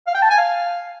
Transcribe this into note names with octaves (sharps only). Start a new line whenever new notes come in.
F5
G5
A5
G#5
F5